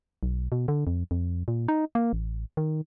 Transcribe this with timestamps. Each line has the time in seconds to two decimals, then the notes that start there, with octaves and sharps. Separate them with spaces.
0.23 B1
0.52 B2
0.68 D3
0.87 F2
1.11 F2
1.48 A#2
1.68 D#4
1.95 A#3
2.13 A1
2.57 D#3